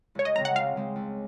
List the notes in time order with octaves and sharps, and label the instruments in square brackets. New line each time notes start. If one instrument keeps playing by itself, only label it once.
[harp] C#2 [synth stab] C#5
[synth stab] D#5
[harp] C#3 G#3 C4 [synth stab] A#5
[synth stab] F#5
[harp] C#2 [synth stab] F5
[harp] C#3 G#3 C4
C#2